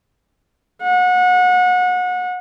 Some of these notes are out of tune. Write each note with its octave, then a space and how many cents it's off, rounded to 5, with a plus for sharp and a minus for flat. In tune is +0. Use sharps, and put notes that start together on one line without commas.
F#5 -30